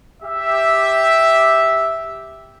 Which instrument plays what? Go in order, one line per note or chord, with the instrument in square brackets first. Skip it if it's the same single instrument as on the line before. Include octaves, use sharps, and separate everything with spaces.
[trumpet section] G4 E5